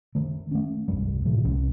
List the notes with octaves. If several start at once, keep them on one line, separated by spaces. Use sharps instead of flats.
D#3 A3
A3 C#4
E1 C2 G2 G3
A2 C3 E3 G#3
C2 G#3 C#4